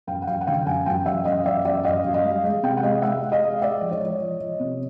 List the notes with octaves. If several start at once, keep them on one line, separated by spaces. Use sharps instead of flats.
F#2 F5 G5
F#5
F#2 F5 G5
F#5
D3 F5 G5
F#2 F#5 G#5
F#2 F5 G5
F#2 E5 F#5
F#2 D#5 F5
F#2 D5 E5
F#2 D5 E5
F#2 D#5 F5
F#2
D#5 F5
G3
G#3
C3 F5 G5
F#5
G#3 D#5 F5
G#3 E5 F#5
G#3
D#5 F5
G#3
G#3 D5 E5
F3
C#5 D#5
F3
F3
F3
C3